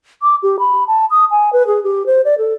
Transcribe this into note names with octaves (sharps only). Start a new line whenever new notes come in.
D6
G4
B5
A5
D#6
G#5
B4
G#4
G4
C5
D5
A4